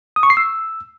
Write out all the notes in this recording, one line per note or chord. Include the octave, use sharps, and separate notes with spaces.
D#6
C#6
C7
E6